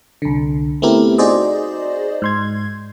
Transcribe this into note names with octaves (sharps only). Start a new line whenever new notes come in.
C2 D3
A3 B3 C4 E4 G4 A#4
D#4 F#4 G#4 C5 D5 D#5
G#2 C6 G#6